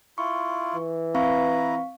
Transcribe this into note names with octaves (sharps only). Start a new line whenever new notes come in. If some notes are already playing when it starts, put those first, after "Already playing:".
E4 F4 C#6
E3
C4 E4 B4 F5 A#5 C#6